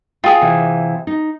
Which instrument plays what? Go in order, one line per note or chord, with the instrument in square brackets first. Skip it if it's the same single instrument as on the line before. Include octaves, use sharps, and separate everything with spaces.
[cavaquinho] F4 G#4 [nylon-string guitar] G5
[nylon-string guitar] C3 E3
D#4